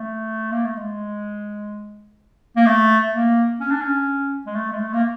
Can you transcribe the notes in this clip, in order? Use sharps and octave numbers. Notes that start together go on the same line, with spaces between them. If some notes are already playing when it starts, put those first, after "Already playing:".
Already playing: A3
A#3
A3
G#3
A#3
A3
A#3
C#4
D4
C#4
G#3
A3
G#3
A3
A#3